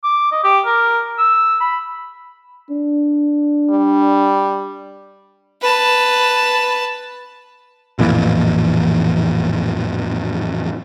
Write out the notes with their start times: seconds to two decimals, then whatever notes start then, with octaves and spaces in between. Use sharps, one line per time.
0.04 D6
0.31 D#5
0.43 G4
0.66 A#4
1.18 E6
1.60 B5
2.70 D4
3.70 G3
5.61 B4 A5
7.99 A1 F2 A#2 E3